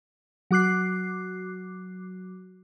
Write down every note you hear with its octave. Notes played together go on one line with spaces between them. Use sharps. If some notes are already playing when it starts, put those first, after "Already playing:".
F#3 F#4 D6 F#6 C7